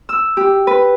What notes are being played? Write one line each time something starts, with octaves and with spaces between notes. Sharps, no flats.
E6
G4
B4